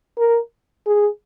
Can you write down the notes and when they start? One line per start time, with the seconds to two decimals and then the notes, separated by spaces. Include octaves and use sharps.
0.18 A#4
0.87 G#4